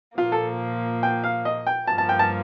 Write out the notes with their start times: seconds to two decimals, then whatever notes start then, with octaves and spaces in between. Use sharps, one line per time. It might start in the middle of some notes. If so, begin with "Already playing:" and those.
0.18 A#2 F3 A#3 F4
0.32 A4
1.03 G5
1.24 F5
1.45 D#5
1.67 G5
1.87 G2 F3 A#3 A5
1.98 A5
2.09 G5
2.19 A5